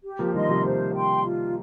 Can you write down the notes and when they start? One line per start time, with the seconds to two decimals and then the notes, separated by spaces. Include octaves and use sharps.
0.05 G4
0.19 F3 A#3
0.34 D#3 G3 D#5 C6
0.49 C3 F3
0.65 C3 C5
0.94 G5 C6
1.24 F4